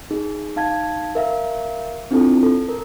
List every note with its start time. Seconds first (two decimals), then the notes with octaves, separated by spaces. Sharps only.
0.11 D#4 G#4
0.56 D#4 F5 A5 G#6
1.15 A#4 E5 F5
2.11 C4 D4 E4 F4 A4
2.43 A4
2.68 A#4